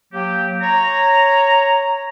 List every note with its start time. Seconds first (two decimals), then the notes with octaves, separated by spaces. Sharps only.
0.13 F#3 A#3 G4
0.62 C#5 A#5